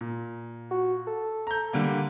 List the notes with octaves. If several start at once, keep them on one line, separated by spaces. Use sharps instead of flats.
A#2
F#4
A4
A#5 G6
D3 G3 A#3